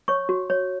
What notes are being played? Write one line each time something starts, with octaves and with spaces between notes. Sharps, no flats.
C#5 C#6
F#4
C#5